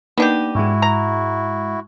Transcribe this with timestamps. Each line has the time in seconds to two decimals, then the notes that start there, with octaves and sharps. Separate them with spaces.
0.18 A#3 B3 D4 D#4 G4
0.55 G#2 G#3 E4 F#4
0.82 A#5